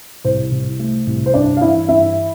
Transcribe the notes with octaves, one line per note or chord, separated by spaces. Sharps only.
C2 C5
C2
A3
C2
C5
G2 D4 D5
F5
E3 E4 E5
G2 E4 E5